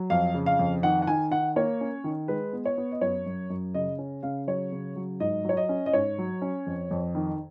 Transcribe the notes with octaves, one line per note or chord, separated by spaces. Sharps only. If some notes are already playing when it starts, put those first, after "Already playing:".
Already playing: F#3
F2 F5
C#3
F5
F2
D#3 F#5
F#5
D#3 G#5
D#3 F#5
A#3 C#5
C#4
D#3
G#3 B4
B3
C#5
B3
D#5
F#2 C#5
F#2
F#2
C#3 D#5
C#4
C#3 F5
F#3 C#5
C#3
F#3
G#2 D#5
F#3 C#5
D#5
C#4
D#5
G#2 C#5
F#3
C#4
F2
F2
D#3